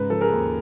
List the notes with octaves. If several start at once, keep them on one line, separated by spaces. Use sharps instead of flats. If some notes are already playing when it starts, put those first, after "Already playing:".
Already playing: G#2 C#3 B4
F3 A4
G#4 A#4
D#2